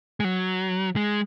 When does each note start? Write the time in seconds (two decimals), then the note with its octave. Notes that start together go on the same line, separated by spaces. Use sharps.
0.20 G#3
0.24 F#3
0.96 G#3